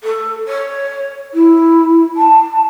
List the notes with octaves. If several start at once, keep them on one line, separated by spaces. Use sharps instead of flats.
A4
C#5
E4
A5